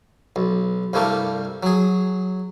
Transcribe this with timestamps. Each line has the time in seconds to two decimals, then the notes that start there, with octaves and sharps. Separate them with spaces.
0.36 B1
0.93 C2 G2 G3 A3 A#3
1.63 F#3 G#4